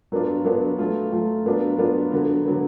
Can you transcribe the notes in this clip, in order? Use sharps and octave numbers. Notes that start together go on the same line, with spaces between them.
F#3 B3 D4 F4
F#3 B3 D4 F4
F#3 A3 F4
F#3 A3 F4
F#3 B3 D4 F4
F#3 B3 D4 F4
D3 F#3 B3
D3 F#3 B3